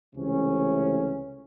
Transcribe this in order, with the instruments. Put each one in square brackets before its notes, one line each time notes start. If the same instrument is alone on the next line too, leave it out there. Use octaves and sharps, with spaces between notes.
[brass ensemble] C#2 C3 E3 A3 C#4